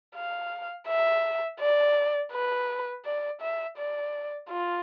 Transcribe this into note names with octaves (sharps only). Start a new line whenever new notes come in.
F5
E5
D5
B4
D5
E5
D5
F4